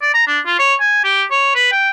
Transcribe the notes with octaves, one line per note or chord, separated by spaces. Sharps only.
D5
A#5
D4
F4
C#5
G#5
G4
C#5
B4
G5